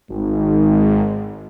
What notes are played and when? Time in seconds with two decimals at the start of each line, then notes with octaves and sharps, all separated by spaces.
0.10 G#1 G#2